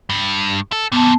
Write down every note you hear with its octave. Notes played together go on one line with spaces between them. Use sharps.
G2
A4
F2 A#2 B3 A5